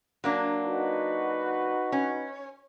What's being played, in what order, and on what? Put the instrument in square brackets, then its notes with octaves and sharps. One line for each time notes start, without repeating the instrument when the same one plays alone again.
[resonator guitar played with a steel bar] F#3 A#3 D4
[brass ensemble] D#4 F#4 B4
[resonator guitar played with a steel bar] C#4